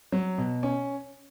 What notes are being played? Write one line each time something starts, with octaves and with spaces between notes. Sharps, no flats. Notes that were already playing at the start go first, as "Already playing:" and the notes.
F#3
B2
C#4